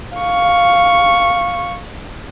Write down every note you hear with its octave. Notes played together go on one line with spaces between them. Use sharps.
F5 C#6